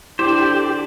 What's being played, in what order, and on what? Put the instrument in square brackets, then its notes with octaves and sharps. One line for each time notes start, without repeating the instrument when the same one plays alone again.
[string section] D3 D5 [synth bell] E4 [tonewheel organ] G4 [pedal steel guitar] C5